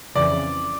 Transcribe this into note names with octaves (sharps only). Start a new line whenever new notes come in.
F2 C#3 E3 D5